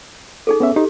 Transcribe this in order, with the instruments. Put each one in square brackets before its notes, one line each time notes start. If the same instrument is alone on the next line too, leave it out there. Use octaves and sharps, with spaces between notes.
[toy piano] D#4 G#4 A4
[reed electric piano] B3 C#4 E5
[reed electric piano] D#4 [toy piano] G4